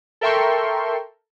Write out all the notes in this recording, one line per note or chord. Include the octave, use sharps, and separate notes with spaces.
A4 A#4 E5 G5 C6 C#6